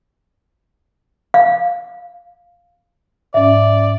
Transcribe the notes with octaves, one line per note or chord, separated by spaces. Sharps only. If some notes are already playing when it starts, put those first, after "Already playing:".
F5
G#2 C#4 D5 E5